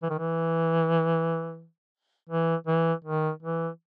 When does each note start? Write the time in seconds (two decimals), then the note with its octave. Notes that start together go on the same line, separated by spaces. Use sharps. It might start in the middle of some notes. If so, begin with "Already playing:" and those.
0.03 E3
0.10 D#3
0.19 E3
2.29 E3
2.67 E3
3.05 D#3
3.42 E3